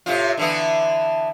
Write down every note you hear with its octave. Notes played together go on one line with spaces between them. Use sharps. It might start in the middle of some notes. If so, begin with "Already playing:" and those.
A2 C3 F4
D3 E3 B3